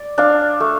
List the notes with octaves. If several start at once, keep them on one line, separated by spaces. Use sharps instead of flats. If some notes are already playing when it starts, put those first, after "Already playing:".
Already playing: D5
D4 F5
A3